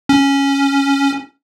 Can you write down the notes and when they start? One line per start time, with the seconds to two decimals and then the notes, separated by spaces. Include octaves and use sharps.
0.09 C#4